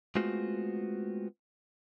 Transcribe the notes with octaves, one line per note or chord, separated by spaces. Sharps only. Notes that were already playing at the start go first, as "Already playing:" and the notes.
G#3 A3 B3 C4 F4 F#4